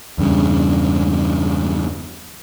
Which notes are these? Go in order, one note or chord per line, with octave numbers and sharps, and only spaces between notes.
E2 G2 C#3